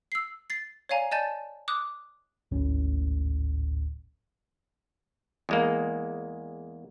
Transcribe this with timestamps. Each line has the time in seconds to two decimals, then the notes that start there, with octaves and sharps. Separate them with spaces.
0.12 E6 C7
0.50 A6 C7
0.89 C#5 D5 F5 G#5 A#5
1.12 D5 D#5 G#5 A5 G6 A6
1.68 D6 D#6 F#6
2.52 D1 G#1 A2 C#4
5.49 E2 G#3 A#3